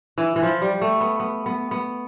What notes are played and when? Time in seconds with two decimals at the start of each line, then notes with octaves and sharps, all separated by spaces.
0.18 E3
0.36 E3
0.43 F3
0.62 G3
0.81 A3
1.01 B3
1.20 B3
1.46 B3
1.71 B3